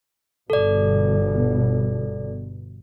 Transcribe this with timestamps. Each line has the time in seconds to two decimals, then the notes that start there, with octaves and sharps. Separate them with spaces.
0.50 G1 B2 A4 D5